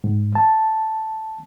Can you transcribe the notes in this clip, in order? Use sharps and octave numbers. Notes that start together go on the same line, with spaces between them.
G#2
A5